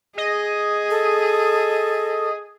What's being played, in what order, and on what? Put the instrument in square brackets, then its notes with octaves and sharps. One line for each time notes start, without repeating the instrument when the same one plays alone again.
[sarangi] G#4 [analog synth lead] D#5
[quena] A4